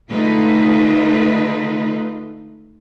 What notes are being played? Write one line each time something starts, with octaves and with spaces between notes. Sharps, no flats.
D3 G#3 A3 D#4 F4 B4